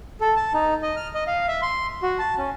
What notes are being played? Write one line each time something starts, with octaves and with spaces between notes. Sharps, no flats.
A4
A5
D#4
D#5
F6
D#5
F5
E5
C6
F#4
A5
C#4